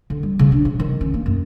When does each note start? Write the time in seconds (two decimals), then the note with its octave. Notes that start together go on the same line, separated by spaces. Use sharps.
0.10 D3
0.23 G3
0.39 C#3
0.52 D4
0.65 C#3
0.80 D#3
1.01 C#4
1.14 A#3
1.26 F#2